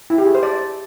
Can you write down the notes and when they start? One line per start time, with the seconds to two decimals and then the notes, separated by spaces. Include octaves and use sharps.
0.10 E4
0.18 G4
0.26 G#4
0.35 C5
0.43 D5